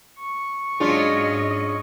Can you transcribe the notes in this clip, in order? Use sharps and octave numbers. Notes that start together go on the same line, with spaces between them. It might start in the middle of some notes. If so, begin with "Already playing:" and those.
C#6
G#2 F#3 C#4 D4 F4 G#4 D#5